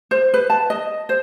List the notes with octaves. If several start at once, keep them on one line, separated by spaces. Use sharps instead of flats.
C5
B4
A5
D#5
C5